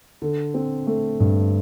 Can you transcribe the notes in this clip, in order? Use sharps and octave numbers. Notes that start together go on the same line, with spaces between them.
D3
C4
A3
G2